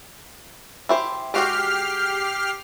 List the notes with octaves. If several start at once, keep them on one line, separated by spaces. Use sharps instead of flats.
E4 G4 C5
G#3 F#4 G4 G5 F6 C7